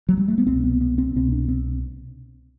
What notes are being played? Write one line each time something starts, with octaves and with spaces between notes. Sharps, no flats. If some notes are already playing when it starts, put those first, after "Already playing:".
F#3
G3
A3
B3
C2 B2 C4
B3
B3
C4
C2 B2 C4
D4
C4